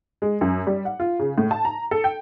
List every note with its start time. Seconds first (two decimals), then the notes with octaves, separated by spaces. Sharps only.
0.22 G#3
0.41 F#2
0.67 G3
0.85 F#5
1.00 F4
1.19 C#3
1.38 A2
1.51 A5
1.65 A#5
1.91 A4
2.04 G5